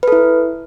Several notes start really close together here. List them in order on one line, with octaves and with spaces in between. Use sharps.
B4 A4 E4